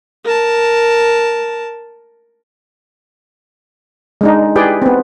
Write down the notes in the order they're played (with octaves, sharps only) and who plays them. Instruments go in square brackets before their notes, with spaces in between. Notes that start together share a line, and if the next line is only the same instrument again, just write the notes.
[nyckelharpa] A#4 A5
[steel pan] G#3 D4 D#4
E4 G4 G#4 B4 D5 G5
B3 C4